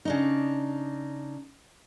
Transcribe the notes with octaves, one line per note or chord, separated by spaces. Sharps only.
C#3 D4 D#4